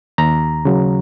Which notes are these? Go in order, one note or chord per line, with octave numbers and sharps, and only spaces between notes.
D#2 A#5
C#3 F#3